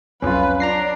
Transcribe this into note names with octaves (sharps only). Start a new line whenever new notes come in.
C2 F2 F#3 C#4 F4 B4
D4 A#5 A#6 C7